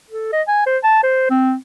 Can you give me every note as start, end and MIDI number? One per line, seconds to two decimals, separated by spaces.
0.10 0.29 69
0.32 0.42 75
0.48 0.63 80
0.66 0.78 72
0.83 1.00 81
1.03 1.29 72
1.30 1.54 60